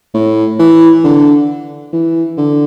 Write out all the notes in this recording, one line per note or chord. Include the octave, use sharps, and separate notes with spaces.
A2
E3
D3
E3
D3